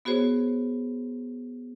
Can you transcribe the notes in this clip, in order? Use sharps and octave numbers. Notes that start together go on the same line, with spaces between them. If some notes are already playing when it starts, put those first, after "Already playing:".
B3 F#4 G#4 C5 C#5